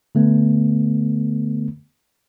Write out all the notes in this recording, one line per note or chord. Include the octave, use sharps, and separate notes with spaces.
D3 A3 B3